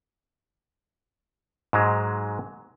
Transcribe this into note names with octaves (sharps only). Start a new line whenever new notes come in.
G#2 F#3 G#3